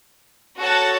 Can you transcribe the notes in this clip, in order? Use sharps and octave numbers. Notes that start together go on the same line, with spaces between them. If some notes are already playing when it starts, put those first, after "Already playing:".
F#4 A4 C#5 F#5 A5